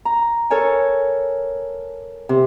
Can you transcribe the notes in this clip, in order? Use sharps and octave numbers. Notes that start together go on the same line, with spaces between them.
A#5
A4 A#4 C#5 G#5
C3